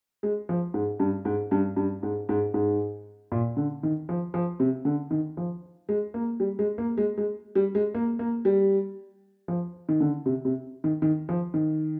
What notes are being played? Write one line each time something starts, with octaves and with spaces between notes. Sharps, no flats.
G#3
F3
G#2
G2
G#2
G2
G2
G#2
G#2
G#2
A#2
D3
D#3
F3
F3
C3
D3
D#3
F3
G#3
A#3
G3
G#3
A#3
G#3
G#3
G3
G#3
A#3
A#3
G3
F3
D#3
D3
C3
C3
D#3
D#3
F3
D#3